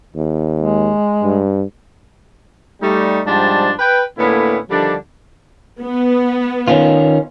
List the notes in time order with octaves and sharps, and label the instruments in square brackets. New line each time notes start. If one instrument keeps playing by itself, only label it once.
[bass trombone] D#2
[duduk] G#3
[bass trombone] G2
[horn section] G3 A3 D#4
G#2 F3 G3 D4 C5 A5
B4 G5
A2 D3 A#3 B3 C#4 E4
D3 D#3 F3 G3 D4
[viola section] B3
[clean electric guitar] D#3 C#4 F4